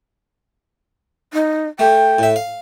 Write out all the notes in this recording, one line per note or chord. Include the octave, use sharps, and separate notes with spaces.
D#4
A3 G5
A2 E5
F5